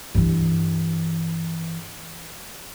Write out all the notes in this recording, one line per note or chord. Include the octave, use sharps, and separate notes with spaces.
G2 E3